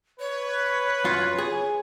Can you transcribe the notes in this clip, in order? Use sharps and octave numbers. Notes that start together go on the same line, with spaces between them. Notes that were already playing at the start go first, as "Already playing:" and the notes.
B4 C#5
F#2 F4
G#4